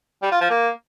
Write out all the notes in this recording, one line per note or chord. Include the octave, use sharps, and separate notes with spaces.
G3
F4
F3
A#3